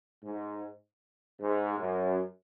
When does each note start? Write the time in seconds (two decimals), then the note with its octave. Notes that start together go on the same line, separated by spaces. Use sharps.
0.24 G#2
1.41 G#2
1.79 F#2